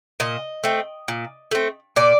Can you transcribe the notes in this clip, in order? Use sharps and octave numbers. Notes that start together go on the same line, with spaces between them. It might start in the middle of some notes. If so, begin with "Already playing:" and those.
A#2 D#5
A3 C4
A#2
A3 C4
A#2 D5